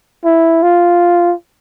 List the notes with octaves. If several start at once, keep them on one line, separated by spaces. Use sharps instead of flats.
E4
F4